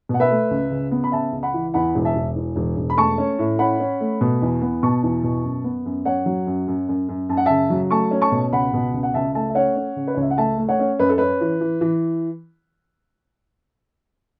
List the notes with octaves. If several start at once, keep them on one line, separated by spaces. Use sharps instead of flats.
B2 F#5
B4 E5
A3
C#2
C#3
B3
B5
C#3 E5 A5
C#2
F#5 B5
E3
E2 F#5 B5
E1
E5 A5
E1
E2
E1
E1
B5
A3 A5 C#6
C#4
A2
C#4 F#5 B5
C#4
A3
B2
E2
B3
B2 A5 C#6
E2
B2
F#2
B3
F#2
F#2 C#5 F#5
F#3
F#2
F#2
F#2
F#2
F#2 A5
F#5
C#3 E5 A5
F#3
A3 A5 C#6
C#4
A5 C#6
B2
C#2 F#5 B5
B2
C#2
F#5
C#2 E5 A5
A3 E5 A5
E5
C#4 C#5 F#5
C#4
C#3
B4
C#2 C#5
E5
F#5
A3 E5 A5
A3
C#5 F#5
C#4
F#2 B4
A4
C#4 B4
E3
E3
E3